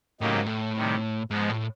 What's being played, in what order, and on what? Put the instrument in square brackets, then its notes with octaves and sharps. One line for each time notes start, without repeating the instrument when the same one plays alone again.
[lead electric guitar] A2 [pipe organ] C#3 F#3 A#3 D#4 G4
[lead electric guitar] G#2
A2
[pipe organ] C3 D#3 G3
[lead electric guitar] G#2 [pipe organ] F3 G#3 B3
[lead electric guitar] A2